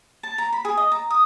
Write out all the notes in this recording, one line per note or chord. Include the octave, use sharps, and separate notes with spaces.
A5
A#5
B5
G#4
D#5
A#5
D#6